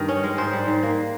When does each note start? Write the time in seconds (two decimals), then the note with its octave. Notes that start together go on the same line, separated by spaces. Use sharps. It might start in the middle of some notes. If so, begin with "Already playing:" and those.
Already playing: G2 D#3
0.08 C#4
0.24 G#3
0.38 G#2 C5
0.53 G3
0.68 G#2
0.83 A#3